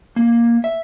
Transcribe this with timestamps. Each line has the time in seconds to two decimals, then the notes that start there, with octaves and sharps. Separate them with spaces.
0.16 A#3
0.64 E5